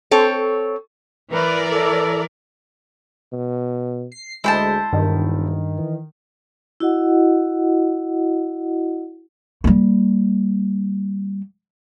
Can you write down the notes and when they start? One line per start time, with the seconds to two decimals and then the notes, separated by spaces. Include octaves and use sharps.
0.11 C4 A4 C#5
1.31 E3 A#4 B4 D5
1.70 A4
3.32 B2
4.12 C7
4.44 D2 G#3 E4 C5 A5
4.93 E1 G2 D#3
5.77 E3
6.80 E4 F#4 D#5 F#5
9.64 G3 A#3